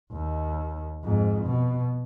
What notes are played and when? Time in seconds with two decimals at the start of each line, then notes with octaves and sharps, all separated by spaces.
0.12 D#2
1.04 F2 G#2
1.46 B2